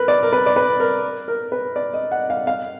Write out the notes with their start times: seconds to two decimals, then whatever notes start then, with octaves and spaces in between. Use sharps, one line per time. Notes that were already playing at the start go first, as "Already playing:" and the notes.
Already playing: A#4 B4
0.08 D5
0.23 A#4
0.33 B4
0.46 D5
0.56 B4
0.80 A#4
1.28 A#4
1.52 B4
1.76 D5
1.94 D#5
2.12 F#5
2.30 F5
2.47 F5